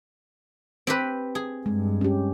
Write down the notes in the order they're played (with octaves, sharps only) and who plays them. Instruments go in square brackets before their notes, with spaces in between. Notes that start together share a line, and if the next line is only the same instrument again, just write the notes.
[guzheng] C4 G4 B4
G#4
[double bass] G2 [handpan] G#3
[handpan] C#4 G4